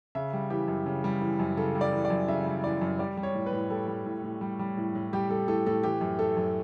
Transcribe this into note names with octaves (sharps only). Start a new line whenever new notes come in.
C#3 E5
G3
E3 G4
F#2
C#3
G3
E3
F#2
C#3 A4
G3
D5
E3
D5
F#2
C#3 E5
G3
E3 D5
F#2
G3 D5
G3
C#5
A2
B4
A2
G3 A4
G3
A2
A2
G3
G3
A2
A2
G3 G4
G3 A4
A2 A4
A2 A4
E3 G4
F#2
A3 A4
F#2